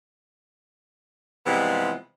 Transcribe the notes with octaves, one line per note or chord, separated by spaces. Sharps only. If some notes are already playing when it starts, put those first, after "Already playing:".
C3 E3 F3 G3 G#3 B3